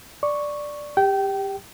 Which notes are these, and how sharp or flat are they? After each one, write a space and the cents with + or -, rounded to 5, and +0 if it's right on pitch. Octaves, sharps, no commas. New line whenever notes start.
D5 +0 C#6 +0
G4 +20 G5 -20